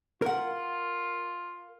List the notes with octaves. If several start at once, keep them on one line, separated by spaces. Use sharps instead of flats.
F4 A#4 F#5